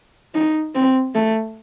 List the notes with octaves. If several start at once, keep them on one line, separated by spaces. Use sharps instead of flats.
D#4
C4
A3